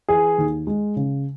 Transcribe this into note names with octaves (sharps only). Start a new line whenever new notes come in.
E3 G#4
D#2
G#3
C#3